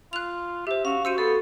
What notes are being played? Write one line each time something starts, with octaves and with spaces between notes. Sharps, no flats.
F4 F#6 F7
G4 C5 E5
C#4 F#4 F5
F#4 C5 E6 C#7 D#7
B3 A4